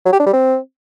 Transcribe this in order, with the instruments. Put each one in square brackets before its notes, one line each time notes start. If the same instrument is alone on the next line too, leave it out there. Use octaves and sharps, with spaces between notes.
[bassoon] F#3
G4
D4
G3
C4